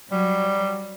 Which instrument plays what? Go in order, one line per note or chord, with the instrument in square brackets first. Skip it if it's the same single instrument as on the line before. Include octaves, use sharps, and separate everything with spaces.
[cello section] F#3 [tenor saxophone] G3